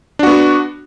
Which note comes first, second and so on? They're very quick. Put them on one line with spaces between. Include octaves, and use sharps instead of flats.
D4 F#4 B3